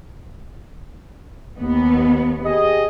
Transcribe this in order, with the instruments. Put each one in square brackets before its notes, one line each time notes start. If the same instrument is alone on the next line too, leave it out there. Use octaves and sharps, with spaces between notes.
[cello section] D#2 B3
[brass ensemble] G4 G#4 D#5